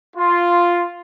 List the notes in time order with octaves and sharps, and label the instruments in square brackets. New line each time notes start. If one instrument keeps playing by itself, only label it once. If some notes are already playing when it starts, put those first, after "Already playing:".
[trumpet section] F4